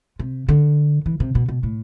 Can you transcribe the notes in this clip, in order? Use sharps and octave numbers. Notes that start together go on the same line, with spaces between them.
C3
D3
E3
C3
B2
B2
A2